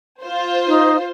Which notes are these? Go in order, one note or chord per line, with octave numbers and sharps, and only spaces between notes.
F4 C5
D#4